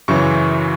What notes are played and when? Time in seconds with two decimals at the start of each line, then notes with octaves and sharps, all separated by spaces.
0.08 F#2 C#3 E3 C#6